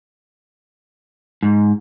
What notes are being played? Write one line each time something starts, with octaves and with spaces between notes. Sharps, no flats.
G#2